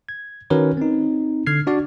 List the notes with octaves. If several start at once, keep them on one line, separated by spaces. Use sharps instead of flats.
G#6
D#3 C#4 F#4 A#4 B4 C#5
C4 D#4
D3 F6 G#6 C7
D4 F#4 D5